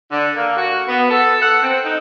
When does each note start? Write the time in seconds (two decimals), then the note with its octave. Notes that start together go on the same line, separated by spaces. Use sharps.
0.12 D3
0.36 A#3
0.57 F#4
0.88 B3
1.11 A4
1.42 F#5
1.62 C4
1.84 D#4